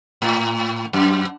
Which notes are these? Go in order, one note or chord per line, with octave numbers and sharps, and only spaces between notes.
A2
F#2